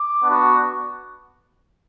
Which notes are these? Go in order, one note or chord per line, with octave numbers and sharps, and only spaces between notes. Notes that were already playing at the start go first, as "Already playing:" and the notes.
Already playing: D6
B3 D4 F#4